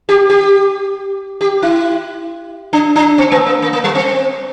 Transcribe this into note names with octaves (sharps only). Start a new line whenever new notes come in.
G4
G4
G4
E4
D4
D4
C4
A3
A#3
A#3
A#3
G3
C4